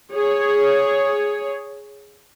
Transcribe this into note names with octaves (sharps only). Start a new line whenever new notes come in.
G#4 C#5